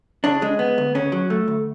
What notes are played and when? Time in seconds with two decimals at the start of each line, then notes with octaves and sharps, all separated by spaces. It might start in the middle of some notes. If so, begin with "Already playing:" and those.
0.24 C#3 D4
0.42 G#3
0.59 B3
0.78 D2
0.95 C#3 C#4
1.12 F#3
1.30 A3
1.48 D2